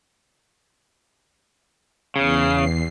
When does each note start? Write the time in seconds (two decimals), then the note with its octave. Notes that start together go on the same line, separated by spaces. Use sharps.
2.16 E2 C#3 C7